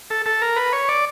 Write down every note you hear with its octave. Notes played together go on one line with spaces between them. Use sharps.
A4
A4
A#4
B4
C#5
D5